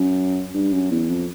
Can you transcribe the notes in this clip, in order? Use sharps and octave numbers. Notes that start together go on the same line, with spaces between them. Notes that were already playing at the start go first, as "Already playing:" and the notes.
Already playing: F#2
G2
F#2
E2
F2